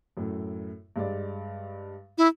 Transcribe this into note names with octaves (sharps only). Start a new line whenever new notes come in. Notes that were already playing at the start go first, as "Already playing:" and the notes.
F#2 A2
G2 G#3 D5
E4